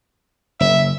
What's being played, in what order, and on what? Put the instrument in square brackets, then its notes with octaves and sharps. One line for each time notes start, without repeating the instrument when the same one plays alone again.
[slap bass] F#1 [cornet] E5